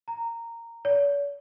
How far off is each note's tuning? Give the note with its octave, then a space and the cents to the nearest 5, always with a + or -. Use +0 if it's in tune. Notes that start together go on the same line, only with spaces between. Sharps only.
A#5 -10
C#5 +45